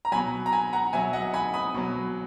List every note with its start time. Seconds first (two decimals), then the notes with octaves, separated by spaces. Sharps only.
0.05 A#5
0.12 F#3 G#5 B5
0.15 B2
0.46 A#5
0.52 G#5 B5
0.73 F#5 A#5
0.93 B2 F#3 E5 G#5
1.13 D#5 F#5
1.34 G#5 B5
1.53 B5 D#6
1.74 B2 F#3